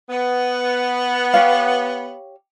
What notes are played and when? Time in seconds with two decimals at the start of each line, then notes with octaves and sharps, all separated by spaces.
0.10 B3
1.34 G4 C#5 F5